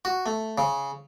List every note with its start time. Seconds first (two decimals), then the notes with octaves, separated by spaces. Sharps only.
0.05 F#4
0.26 A3
0.58 C#3